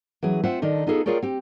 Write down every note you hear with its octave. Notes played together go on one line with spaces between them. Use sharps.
E3 F#3 C#4 G#4
C4 F4 C5 E5 F#5
D#3 D4 D#4 A4
B3 D#4 F4 G#4 A4
F4 G#4 A#4 C#5 D5 G5
C4 G4